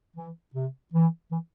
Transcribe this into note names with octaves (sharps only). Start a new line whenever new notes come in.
E3
C3
E3
E3